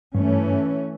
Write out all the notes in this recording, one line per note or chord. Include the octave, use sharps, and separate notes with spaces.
G2 E3 A3 C#4